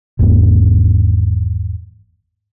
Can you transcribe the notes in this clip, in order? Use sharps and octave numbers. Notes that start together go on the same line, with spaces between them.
G#1 E2 G#2 A#3